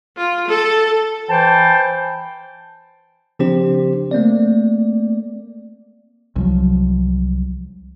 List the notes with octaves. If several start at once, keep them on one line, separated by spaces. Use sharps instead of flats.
F4
A4
E3 C5 G5 A5
C#3 F3 C4 D4 G4 C5
A3 A#3 C4 D5
C2 F3 F#3